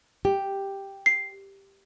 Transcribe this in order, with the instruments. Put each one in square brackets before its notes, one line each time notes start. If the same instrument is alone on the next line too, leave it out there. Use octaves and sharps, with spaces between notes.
[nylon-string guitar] G4
[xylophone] C7